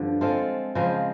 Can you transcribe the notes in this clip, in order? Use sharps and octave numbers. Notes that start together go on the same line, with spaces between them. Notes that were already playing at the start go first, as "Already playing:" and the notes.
Already playing: G2 D3 F3
G#3 C4 F4 A4
C#3 F3 G#3 C4